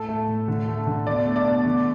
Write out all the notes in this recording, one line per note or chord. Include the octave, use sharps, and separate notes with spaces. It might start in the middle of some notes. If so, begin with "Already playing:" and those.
Already playing: A2 A4
A3
A2
D3
A3
D3
B2 D5
A3
D5
B2
D3